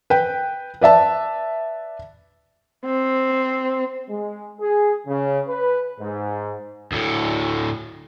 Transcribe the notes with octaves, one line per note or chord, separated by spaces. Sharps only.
B4 G5
B4 D5 E5 A5
C4
G#3
G#4
C#3
B4
G#2
D2 A2